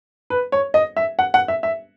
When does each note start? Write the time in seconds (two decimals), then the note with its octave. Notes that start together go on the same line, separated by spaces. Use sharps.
0.30 B4
0.52 C#5
0.74 D#5
0.97 E5
1.19 F#5
1.34 F#5
1.48 E5
1.63 E5